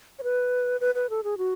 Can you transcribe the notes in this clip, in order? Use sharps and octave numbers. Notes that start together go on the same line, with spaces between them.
C#5
B4
B4
B4
A4
G#4
F#4